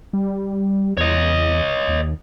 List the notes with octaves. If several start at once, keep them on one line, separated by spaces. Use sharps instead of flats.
G3
E2 C#5 D#5
D#2